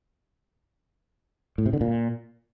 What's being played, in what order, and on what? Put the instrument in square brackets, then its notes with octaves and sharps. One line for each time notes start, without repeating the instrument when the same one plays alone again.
[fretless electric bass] A2
C3
D3
A#2